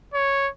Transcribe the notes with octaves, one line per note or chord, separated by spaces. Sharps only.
C#5